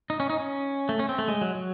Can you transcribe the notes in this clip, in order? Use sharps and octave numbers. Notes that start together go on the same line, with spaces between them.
D#4
C#4
D#4
C#4
A3
C#4
C4
A3
G#3
F#3
F#3